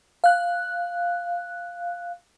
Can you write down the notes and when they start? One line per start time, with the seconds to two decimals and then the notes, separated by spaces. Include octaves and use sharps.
0.24 F5 F#6